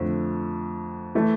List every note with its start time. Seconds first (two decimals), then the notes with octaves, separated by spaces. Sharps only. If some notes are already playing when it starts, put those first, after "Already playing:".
Already playing: F2 D3 F3 A3
1.15 E3 A3